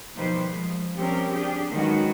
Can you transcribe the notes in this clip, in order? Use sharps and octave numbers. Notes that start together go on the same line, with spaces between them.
B2 D#3 F3 G3 B4 C5
F3 G#3
F3 G3 C4 C#4 G4 A#4
D4 G4 G#4
D#3 F#3 G#3 C#4 F#4 B4